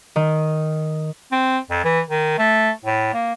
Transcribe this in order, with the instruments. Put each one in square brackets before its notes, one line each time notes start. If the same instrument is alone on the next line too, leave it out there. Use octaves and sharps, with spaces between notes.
[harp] D#3
[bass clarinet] C4
F2
E3
D#3
A3
A2
A#3